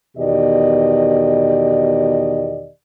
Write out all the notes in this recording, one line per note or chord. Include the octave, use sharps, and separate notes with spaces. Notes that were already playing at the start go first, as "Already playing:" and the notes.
E2 B2 D#3 G4 D5 D#5